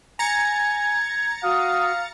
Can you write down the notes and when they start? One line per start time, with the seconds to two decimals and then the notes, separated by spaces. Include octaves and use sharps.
0.19 G#5 A#5 G#6 A6 C#7
1.43 F#4 F5 D#6